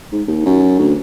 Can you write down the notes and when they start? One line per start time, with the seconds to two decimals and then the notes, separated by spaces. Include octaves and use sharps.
0.12 G#2
0.28 D#2
0.46 F#2
0.79 D2